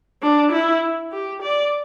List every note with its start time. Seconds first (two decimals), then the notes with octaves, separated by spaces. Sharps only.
0.23 D4
0.52 E4
1.12 G4
1.42 D5